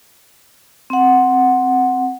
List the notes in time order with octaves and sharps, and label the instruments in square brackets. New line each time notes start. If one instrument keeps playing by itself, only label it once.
[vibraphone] C4 F#5